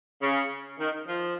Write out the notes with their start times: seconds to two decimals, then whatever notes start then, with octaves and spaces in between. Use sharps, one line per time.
0.21 C#3
0.78 D#3
1.07 F3